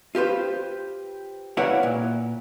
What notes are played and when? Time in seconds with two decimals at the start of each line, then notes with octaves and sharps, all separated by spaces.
0.15 F4 G4 B4 C5
1.57 E4 B4 C#5 D5 F5 F#5
1.83 A#2